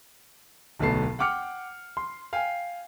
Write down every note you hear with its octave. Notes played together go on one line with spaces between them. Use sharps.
D1 B1 A3 B3 A5 C7
F#5 G5 D6 F6 C#7
C6
F5 G5 G#5